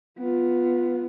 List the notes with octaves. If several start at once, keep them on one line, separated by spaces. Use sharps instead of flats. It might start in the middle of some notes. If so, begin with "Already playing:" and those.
B3 F4